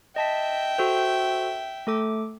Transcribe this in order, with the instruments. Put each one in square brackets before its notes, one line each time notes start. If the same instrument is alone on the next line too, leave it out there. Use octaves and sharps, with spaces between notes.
[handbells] D#5 A5 B6 [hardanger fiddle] E5 G5
[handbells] F#4 A4 C5
A3 A4 D6